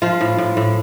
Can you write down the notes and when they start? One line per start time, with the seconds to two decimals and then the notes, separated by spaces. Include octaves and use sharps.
0.02 F3 F4
0.21 A2
0.38 A2
0.57 A2